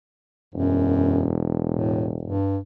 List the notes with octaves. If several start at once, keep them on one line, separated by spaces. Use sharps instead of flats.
E1 F#2
A2
G2